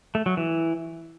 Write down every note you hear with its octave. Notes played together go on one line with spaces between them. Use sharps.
A3
F#3
E3